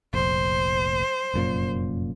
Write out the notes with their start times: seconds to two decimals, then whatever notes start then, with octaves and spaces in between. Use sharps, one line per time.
0.14 F1 A#1 C5
1.34 F1 F#2 A#2